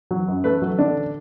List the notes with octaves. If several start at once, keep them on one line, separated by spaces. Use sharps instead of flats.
F#3
F#2
A3 B4
F#3
D3 D4